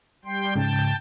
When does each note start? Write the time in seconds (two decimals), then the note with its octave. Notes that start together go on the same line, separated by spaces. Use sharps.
0.25 G3 G5 C6
0.56 G#2 C#3 G5 A5